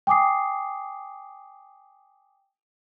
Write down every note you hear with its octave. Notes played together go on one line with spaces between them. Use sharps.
G5 G#5 D6 D#6 C7